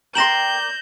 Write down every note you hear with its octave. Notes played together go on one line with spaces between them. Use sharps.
A#4 D5 G5 C6 G6 A#6 E7 F#7